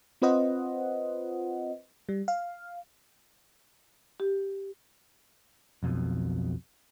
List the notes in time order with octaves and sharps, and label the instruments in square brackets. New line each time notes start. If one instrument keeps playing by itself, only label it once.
[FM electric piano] C4 F4 B4 C5 D#5 F#5
G3
F5
[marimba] G4
[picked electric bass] B1 F2 B2